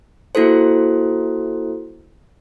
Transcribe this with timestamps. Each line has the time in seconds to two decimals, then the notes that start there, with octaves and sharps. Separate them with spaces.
0.35 A#3 E4 F#4 A4 C5